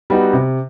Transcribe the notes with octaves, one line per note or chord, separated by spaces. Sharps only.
G3 B3 D#4 F#4
C3